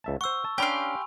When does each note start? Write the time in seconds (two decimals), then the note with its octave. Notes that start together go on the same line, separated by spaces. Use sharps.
0.04 C#2 E5 A5
0.21 C5 F#5 C#6 E6
0.45 A5
0.58 C#4 D4 G4 F5 G#5 B5 C6